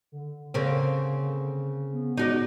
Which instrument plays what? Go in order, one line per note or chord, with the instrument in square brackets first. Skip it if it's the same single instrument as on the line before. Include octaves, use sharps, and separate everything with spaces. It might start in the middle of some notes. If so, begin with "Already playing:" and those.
[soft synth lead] D3
[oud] C#3 A#3 C4
[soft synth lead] B3
[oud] D#4 F#4 D5